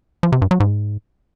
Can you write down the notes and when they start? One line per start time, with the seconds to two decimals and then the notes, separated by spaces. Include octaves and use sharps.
0.23 F3
0.32 C3
0.42 G2
0.51 F#3
0.60 G#2